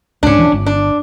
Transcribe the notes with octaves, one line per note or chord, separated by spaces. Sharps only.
C#2 G#2 C#4 D4
D#1 E3 F3
G1
D4